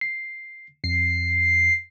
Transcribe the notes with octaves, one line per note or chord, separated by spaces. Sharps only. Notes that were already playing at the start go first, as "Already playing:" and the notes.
C7
F2 C7